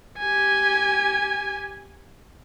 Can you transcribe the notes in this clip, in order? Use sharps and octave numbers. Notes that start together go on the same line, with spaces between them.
G4 G#5